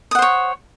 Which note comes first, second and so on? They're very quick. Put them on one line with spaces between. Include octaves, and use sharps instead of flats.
D#6 F#5 C5 C#5